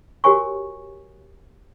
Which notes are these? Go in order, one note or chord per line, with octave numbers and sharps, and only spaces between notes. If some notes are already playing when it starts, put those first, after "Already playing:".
F#4 G4 A#4 C#5 G#5 C#6